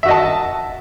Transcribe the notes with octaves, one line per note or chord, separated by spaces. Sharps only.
F#4 D#5 E5 A5